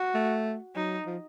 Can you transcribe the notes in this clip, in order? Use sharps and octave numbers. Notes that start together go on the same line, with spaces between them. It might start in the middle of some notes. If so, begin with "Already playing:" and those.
Already playing: F#4
A3
F#3 D#4
F3